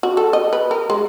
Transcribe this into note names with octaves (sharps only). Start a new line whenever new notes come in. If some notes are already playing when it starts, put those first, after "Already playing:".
F#4
A4
D#5
B4
A#4
G#3